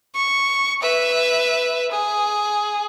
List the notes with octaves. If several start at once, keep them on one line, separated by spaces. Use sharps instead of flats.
C#6
B4 E5
G#4